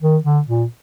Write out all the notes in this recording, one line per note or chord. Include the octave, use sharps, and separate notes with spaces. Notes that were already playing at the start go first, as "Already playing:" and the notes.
D#3
D3
A#2